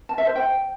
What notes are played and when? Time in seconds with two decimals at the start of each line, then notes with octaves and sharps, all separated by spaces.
0.09 A5
0.18 E5
0.27 C5
0.36 G5